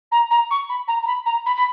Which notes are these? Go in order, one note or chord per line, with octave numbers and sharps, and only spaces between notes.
A#5
A#5
C#6
B5
A#5
A#5
B5
A#5
B5
B5